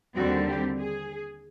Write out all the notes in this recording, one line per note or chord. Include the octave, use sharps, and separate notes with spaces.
D#2 D3 G3 C4 F#4
G4
G#4